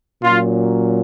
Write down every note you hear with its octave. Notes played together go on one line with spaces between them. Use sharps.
A#2 F#3 C#4 F4